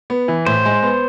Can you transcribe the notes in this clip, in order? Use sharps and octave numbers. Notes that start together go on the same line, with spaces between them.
B3
E3
A2 C5
G#3
B3